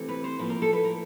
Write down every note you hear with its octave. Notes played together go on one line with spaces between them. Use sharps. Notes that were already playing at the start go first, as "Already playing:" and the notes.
Already playing: C3 E3 A3 C4
B4
C5
A2 F3 A#3 B4
A#4
A4
B4
A#4